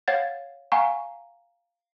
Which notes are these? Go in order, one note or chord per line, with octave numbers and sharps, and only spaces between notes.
C#5 F5 F#5 G#6 A6
F5 F#5 G#5 A#5 C#6